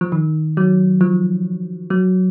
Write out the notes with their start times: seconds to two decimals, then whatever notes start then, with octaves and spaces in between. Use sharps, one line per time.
0.01 F3
0.12 D#3
0.57 F#3
1.01 F3
1.90 F#3